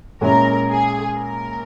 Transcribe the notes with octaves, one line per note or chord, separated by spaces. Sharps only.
A#2 G#3 C#4 E4 A#4
G#4
A#4